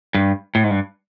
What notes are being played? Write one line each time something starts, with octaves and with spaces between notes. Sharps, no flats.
G2
A2
G#2
G2